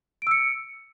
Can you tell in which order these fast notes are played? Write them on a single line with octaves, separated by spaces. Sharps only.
D7 E6 C#7